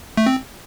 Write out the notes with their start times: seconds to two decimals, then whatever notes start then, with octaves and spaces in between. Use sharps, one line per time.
0.17 A3
0.26 C4